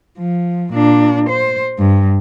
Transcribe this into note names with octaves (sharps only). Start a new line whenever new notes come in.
F3
A#2 D4
C5
G2